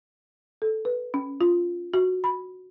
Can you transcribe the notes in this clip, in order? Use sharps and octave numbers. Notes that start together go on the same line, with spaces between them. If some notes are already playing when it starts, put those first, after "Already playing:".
A4
B4
C#4
F4
F#4
B5